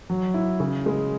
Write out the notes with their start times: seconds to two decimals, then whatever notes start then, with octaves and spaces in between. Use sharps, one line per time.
0.10 F#3
0.34 E4
0.60 C#3
0.86 G#3